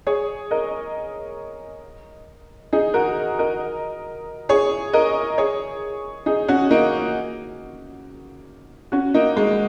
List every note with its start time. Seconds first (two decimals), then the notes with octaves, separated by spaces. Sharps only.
0.07 G#4 C#5
0.51 A#4 D#5
2.73 D#4 G#4
2.94 F#4 A#4
3.39 A#4 D#5
4.49 G#4 C#5
4.93 A#4 D#5
5.38 G#4 C#5
6.26 D#4 G#4
6.48 C#4 F#4
6.71 A#3 D#4
8.92 C#4 F#4
9.14 A#3 D#4
9.37 G#3